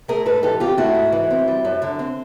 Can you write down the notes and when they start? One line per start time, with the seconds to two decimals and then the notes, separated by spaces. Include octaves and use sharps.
0.08 A3 G#4 A#4
0.26 G#2 A4 B4
0.43 E3 G4 A4
0.60 C4 F4 G4
0.77 A3 E4 F#4
0.95 G#2
1.12 E3
1.30 C4
1.48 G3
1.65 F#2
1.82 D3
1.99 C4